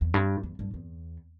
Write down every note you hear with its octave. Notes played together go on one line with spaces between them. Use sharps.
E2
G2
E2
G2
E2